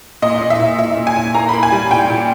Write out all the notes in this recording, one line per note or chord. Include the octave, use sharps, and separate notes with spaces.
A#2 D#5
A#2
E5
A#2
A#2 E5
A#2
G#5
A#2
A#3 A#5
B5
A#3
G#5
G3
A#2 G5
A#2